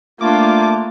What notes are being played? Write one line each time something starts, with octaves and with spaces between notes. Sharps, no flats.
G3 A3 A#3 D4 F4 D6